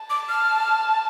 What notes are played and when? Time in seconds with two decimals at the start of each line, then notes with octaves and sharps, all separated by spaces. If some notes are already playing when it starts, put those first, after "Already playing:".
Already playing: A5
0.10 D6
0.29 F6